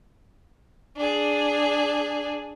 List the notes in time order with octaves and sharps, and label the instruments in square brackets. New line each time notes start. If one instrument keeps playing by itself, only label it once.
[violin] D4 G#4